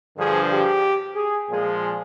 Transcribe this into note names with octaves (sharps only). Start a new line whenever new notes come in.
G2 D3 F3 G#4
G4
G#4
A#2 F3 G#3 G#4